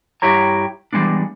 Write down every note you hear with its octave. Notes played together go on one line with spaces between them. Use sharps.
G2 E4 G4 C#5 A#5
E3 G3 G#3 B3 D4